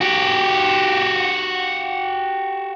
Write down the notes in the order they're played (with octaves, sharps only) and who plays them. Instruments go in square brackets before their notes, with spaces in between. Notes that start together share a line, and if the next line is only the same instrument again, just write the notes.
[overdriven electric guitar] F#4 G4